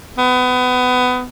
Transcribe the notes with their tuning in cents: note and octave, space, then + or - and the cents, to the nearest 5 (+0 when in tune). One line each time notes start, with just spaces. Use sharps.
B3 +25